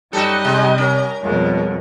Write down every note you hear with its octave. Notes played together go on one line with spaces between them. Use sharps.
F#2 G3 D#4 F#4 A4 D#5
C3 G#3
C#4 A#4
F2 B2 G3 G#3 A#4